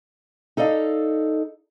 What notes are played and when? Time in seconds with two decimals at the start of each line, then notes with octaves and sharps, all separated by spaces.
0.57 D#4 A4 D5 D#5 F5